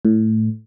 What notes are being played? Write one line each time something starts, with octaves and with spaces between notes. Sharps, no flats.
A2